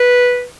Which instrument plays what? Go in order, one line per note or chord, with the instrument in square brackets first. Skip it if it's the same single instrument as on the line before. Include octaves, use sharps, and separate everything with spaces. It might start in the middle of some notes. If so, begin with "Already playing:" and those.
Already playing: [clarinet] B4